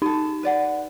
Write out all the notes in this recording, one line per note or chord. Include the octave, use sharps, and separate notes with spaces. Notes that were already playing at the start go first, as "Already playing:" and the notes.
D#4 G#4 A4
B4 D5 F#5